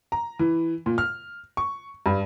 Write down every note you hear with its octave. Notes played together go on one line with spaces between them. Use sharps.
A#5
E3
A#2
F6
C#6
G2